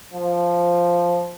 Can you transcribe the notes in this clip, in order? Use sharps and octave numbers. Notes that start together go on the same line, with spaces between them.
F3